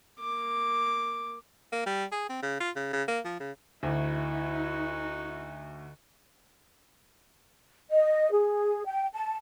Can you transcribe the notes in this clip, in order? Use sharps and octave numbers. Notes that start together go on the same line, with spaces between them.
A#3 D6
A#3
G3
G#4
C4
C#3
F4
C#3
C#3
A#3
F3
C#3
D2 D#4 E4 F#4
D#5
G#4
G5
A5